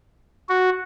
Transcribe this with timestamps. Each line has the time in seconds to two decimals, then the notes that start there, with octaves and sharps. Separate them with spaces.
0.49 F#4